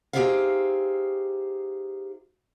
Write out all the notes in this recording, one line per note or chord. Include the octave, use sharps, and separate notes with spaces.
D#4 G4 G#4 C5 E5 F5